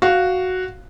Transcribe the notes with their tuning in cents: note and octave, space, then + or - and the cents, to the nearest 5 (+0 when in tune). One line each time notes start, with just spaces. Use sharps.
F#4 +0 F5 +0